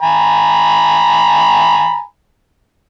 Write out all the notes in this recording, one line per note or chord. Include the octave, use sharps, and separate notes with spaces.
G#5 A#5 B5